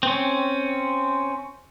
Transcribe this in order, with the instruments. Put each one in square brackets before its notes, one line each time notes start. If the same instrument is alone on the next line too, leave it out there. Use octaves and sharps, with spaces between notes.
[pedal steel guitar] C4 C#4